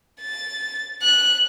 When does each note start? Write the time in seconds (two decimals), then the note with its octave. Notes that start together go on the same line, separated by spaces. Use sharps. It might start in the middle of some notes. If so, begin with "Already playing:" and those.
0.21 A6
1.02 F#6